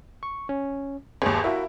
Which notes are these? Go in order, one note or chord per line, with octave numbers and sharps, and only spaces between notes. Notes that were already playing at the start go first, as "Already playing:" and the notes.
C#6
C#4
G1 D#2 G#4
E4 F#4 A#4 F5